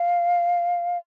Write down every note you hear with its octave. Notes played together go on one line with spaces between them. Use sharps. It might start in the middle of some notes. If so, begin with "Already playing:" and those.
Already playing: F5